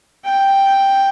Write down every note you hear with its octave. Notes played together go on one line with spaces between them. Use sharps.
G5